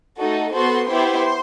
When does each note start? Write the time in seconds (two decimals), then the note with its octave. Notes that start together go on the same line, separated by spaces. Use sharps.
0.19 A3 D#4 F#4 A4
0.53 B3 F#4 A4 C5 C6
0.88 B3 E4 G4 C5 C6